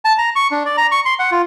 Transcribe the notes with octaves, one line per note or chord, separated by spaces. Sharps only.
A5
A#5
C#6
D4
D5
A#5
C#6
C6
F#5
F4